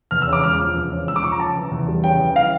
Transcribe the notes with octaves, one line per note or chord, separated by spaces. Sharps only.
E2 F6
E6
C#3
D6
E1 F6
F3
E2
C#3
E1 E6
D6
F3 C#6
A#5
C#3 A5
E3
E2
G3
C#3 G5
E3
F5